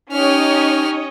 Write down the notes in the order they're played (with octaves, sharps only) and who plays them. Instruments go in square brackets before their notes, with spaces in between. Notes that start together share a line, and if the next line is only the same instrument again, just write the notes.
[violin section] C#4 C#5 D#5 [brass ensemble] D#4 [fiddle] G4 F6